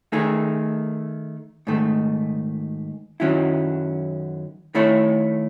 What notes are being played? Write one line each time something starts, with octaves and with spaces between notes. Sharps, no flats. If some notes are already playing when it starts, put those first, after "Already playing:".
D#3 A3 D#4 G#4
G#2 D#3 A3
F#2 D#3 F#3 C#4 E4
D#3 A3 E4 A4 C#5